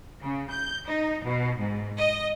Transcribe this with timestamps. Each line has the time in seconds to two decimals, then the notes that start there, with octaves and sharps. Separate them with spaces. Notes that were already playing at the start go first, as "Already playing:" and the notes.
0.21 C#3
0.50 G6
0.87 D#4
1.25 B2
1.58 G#2
1.99 D#5